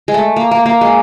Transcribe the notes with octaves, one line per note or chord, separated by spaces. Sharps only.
G#3
A3
A#3
A#3
A#3
G#3